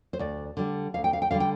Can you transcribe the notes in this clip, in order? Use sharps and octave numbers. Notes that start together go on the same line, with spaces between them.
C5
D2 D5
D3 G3
D2 F5
G5
F5
G5
D3 G3 F5
G5